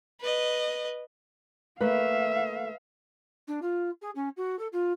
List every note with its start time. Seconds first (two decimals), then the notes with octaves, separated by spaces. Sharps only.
0.21 B4 D#5
1.81 A3 A#3 B4 E5 F5
3.47 D4
3.62 F4
4.01 G#4
4.15 C#4
4.37 F#4
4.59 A4
4.72 F4